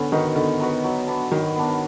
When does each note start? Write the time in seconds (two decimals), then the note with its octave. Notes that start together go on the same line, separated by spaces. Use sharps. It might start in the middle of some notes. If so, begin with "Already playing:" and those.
Already playing: D3 B3 C#4
0.12 D#3 D#4 F#4 B4
0.36 D3 B3
0.60 D#4 F#4 B4
0.84 F#3
1.07 B3 D4
1.31 D#3 F#3
1.56 B3 D4